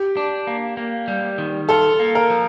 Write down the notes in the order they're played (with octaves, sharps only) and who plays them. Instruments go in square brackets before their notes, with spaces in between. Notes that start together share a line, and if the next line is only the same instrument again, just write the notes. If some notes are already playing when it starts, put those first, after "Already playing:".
Already playing: [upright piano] G4
[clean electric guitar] D4
A#3
A#3
G3
D#3
[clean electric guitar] F4 [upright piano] A4
[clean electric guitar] A#3
[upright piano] A#4
[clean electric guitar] F3